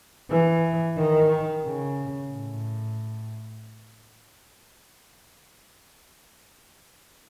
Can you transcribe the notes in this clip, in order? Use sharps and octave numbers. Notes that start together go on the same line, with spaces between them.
E3
D#3
C#3
A2